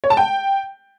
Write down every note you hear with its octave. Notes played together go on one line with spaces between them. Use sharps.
C#5
A5
G5